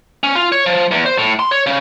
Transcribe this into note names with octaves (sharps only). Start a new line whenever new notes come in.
C#4
F4
C#5
F3
E2
C5
A2
C6
C#5
C#3